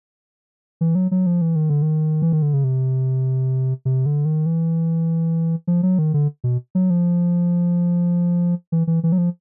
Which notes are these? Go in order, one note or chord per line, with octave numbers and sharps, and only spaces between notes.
E3
F#3
F#3
F3
E3
D#3
D3
D#3
E3
D#3
D3
C#3
C3
C3
D3
D#3
E3
F3
F#3
D#3
D3
B2
F#3
F3
E3
E3
E3
F#3
F3